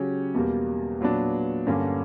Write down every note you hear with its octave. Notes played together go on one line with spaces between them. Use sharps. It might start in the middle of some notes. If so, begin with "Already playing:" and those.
Already playing: C#3 F#3 C#4 G4
E2 B2 G3 A#3
A#2 F#3 B3 D4
G2 D3 A#3 C#4